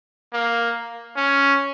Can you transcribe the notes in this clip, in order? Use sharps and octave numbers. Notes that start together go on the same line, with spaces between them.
A#3
C#4